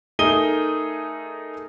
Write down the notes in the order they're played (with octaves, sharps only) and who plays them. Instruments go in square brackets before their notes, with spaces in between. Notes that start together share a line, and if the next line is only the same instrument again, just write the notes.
[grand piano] A3 D#4 G#4 A#4 D#7 G7